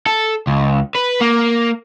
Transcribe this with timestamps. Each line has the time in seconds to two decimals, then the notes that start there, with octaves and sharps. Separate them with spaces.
0.07 A4
0.47 C#2
0.95 B4
1.21 A#3